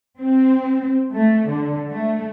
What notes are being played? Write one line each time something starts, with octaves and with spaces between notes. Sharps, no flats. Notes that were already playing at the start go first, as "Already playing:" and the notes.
C4
A3
D3
A3